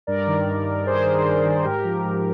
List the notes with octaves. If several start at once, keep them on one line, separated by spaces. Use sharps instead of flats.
G2 A#4 D5
D#3
G2
D#3
G2 G#4 C5
D#3
G2
D#3
G#2 G4 A#4
F3
G#2